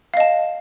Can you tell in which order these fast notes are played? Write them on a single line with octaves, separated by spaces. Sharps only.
F5 D#5 A5